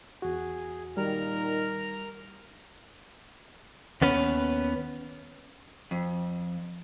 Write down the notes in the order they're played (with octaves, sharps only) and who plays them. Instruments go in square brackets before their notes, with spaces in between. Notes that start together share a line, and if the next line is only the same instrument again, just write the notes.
[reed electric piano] E2 F#4 [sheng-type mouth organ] G#4
[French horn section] A#2 D#3 [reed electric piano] G3 [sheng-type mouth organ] A#4 A#5 F6
[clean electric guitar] D#2 B3 C#4 B4
[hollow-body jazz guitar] F2